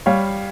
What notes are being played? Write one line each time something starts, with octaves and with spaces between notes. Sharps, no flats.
G3 C#5 F5